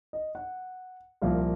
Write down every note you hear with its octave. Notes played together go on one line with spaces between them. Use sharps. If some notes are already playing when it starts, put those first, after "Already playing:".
D#5
F#5
C2 A#2 F3 A#3 F5